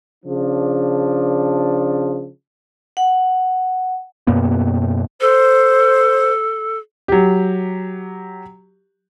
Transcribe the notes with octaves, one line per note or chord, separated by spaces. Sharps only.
C#3 F3 D4
F#5
F#2 B2 A#3 B3
A4 C5
F#3 G4